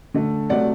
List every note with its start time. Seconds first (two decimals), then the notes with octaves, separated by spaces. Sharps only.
0.14 D3 A3
0.50 C3 F#3 A3 D5 F#5